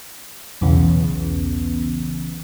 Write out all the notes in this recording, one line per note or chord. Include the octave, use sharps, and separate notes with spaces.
B1 E2 C#3 B3